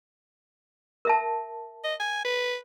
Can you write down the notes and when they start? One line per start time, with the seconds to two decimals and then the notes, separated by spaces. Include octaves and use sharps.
1.05 A#4 E5 A5
1.84 D#5
2.00 G#5
2.25 B4